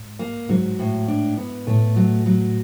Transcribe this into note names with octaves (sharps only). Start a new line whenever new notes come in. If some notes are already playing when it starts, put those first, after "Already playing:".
Already playing: G#2
A#3
G#2 F#3
A2
D4
B3
A2 A3
F#3
F#3